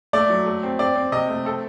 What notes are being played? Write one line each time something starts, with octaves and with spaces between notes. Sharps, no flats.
A3 D5
F#3
A3
C4
C4 D5
C4
C3 D#5
A3
C4 A4